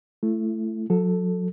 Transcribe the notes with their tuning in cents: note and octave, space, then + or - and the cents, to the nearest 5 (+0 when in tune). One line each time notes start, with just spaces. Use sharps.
A3 +0 E4 +30
F#3 -40 A4 +0